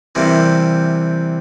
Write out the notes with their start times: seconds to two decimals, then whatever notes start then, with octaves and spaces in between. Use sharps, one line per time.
0.15 C3 E3 G3 A#3